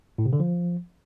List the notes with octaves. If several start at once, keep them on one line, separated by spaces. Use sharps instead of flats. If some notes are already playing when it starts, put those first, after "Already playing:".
A2
C3
D3
F3